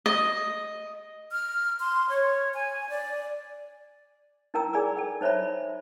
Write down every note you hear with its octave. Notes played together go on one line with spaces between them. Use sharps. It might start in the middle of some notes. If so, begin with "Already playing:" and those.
D#5
F6
C6
C#5
G#5
D5
D#4 E4 A#4 G5 A#5 E6
G#4 D5 G#5 B5 D6 E6
A4 G5
D#4 C5 C#5 E5 B5